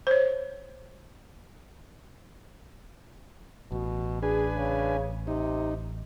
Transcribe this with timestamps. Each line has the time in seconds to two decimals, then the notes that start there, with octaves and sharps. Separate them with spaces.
0.07 C5 C#5
3.72 A1 B2
4.23 D4 G#4 B4 G#5
4.57 C#3
5.27 C3 D#4